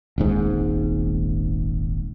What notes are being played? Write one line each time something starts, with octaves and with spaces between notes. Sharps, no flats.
D#1 G#1 G#2